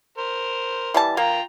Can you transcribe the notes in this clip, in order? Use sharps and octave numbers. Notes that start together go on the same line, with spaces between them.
A#4 C5
E3 G3 A5
A#3 F4 G5 A#5